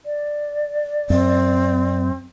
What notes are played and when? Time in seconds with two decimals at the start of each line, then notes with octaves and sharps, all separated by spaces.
0.05 D5
1.10 F#2 C4